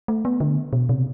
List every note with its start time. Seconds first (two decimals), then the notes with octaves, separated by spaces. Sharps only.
0.08 A3
0.25 B3
0.40 D3
0.73 B2
0.89 C3